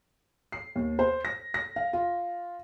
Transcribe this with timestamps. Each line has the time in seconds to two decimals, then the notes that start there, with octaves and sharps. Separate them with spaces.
0.52 C7
0.75 D#2
0.99 C5
1.25 A#6
1.54 A#6
1.76 F5
1.93 F4